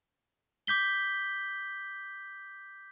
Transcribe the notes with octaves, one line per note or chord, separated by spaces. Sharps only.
D6 G6 B6 G7